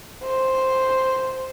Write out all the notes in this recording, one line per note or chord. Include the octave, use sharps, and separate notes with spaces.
C5